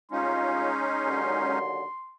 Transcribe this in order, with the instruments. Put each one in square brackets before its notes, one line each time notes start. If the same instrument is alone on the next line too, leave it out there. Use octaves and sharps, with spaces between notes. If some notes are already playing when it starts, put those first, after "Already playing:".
[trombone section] C2 F4 [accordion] G#3 C#4 D#4 [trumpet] C6
[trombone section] D#2 D3 F#3